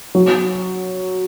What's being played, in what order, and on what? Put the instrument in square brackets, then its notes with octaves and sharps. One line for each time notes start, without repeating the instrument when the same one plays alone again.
[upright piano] F#3